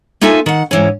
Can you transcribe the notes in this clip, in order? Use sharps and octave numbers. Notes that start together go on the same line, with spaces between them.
A#3 D#4 F4 A4 E5 G#5
D#3 F#5
G#2 E3 C#4